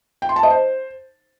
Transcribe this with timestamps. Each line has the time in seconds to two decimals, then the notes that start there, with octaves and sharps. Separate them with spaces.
0.22 G5
0.29 C6
0.36 A5
0.43 D#5
0.50 C5